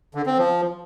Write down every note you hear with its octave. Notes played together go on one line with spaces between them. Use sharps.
D3
C4
F3